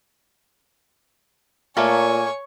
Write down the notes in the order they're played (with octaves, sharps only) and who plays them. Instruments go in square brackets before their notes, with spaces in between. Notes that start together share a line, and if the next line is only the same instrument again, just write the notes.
[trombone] A#2 [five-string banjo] A3 A#3 A4 [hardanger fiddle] C#5 C#6 [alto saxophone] G#5